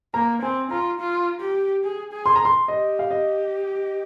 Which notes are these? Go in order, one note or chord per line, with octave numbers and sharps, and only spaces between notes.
A#3 A#5
C4 G#5
F4 A#5
F4
G4
G#4
G#4
C6
A#5
C6
G4 D#5
F5
D#5